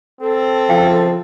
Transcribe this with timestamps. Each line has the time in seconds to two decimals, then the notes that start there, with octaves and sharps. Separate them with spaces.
0.21 C4 A4
0.69 C#3 E3 F3 F5 G5 A5